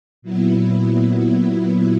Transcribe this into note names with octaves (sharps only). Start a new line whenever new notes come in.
A#2 F#3 B3 E4